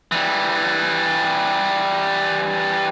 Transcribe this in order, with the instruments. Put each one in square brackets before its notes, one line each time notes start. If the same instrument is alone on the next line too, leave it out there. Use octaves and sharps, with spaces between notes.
[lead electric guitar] E3 G3